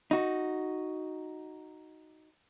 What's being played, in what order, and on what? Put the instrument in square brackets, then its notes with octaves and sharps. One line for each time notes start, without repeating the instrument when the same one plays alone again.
[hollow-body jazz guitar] D#4 F#4